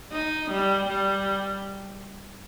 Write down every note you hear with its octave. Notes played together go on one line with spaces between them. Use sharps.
D#4
G3
G3